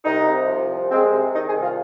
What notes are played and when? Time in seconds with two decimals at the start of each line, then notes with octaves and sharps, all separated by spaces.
0.04 C2 D#4
0.27 C3
0.48 F3
0.70 C2
0.91 G#3 C4
1.13 C3
1.34 D#3 D#4
1.48 G#4
1.56 C2
1.62 F4